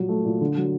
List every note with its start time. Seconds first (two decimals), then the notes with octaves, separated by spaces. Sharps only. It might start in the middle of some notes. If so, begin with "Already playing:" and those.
Already playing: A#2 F#3 G3
0.09 A3
0.25 A#2
0.41 D3
0.57 F#3